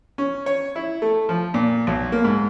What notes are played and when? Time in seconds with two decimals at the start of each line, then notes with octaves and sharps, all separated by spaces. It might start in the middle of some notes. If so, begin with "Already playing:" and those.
0.18 C#4
0.46 C#5
0.76 E4
1.02 A3
1.29 F3
1.54 A#2
1.87 B1
2.12 A#3
2.24 G#2